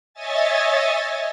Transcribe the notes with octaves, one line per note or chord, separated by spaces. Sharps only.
C#5 D#5 E5 G#5 A6